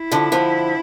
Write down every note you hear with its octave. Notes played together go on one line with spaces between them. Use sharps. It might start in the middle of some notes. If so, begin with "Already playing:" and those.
Already playing: E4
D3 F3
D3 F3